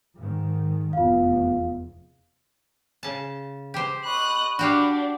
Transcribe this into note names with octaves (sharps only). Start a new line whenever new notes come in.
G#2 D#3
F1 E2 F4 F5
C#3 A5
G4 C5
D#5 B5 C#6 F#6
D4 F#4 G4 F5